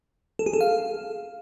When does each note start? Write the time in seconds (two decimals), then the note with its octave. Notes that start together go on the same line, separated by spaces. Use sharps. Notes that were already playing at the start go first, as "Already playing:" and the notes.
0.39 A4
0.46 G#4
0.53 A4
0.61 F5